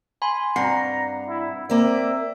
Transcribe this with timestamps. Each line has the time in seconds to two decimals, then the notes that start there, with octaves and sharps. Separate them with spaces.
0.22 G#5 B5 C6
0.56 G2 C4 F#5 A#5 C7
1.27 E4
1.70 A#3 C4 D5 E5